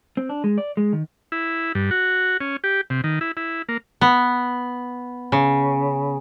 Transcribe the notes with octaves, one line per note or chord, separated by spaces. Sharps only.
C4
D4
G#3
D5
G#3
D#3
E4
G2
F#4
C#4
G4
C3
D#3
E4
E4
A#3
B3
C#3